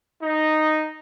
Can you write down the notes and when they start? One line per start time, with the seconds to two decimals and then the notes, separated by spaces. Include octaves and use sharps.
0.23 D#4